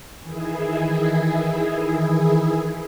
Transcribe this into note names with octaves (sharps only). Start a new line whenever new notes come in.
D#3 E3 E4 G#4